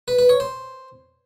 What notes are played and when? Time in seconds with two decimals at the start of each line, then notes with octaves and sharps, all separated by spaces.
0.08 B4
0.19 B4
0.29 C#5
0.40 C5